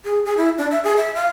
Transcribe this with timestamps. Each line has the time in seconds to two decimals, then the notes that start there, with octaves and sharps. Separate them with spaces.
0.05 G#4
0.25 G#4
0.37 E4
0.58 D4
0.71 E5
0.84 G#4
0.97 E5
1.15 F5